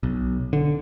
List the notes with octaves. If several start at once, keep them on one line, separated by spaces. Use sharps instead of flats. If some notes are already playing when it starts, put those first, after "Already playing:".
B1
D3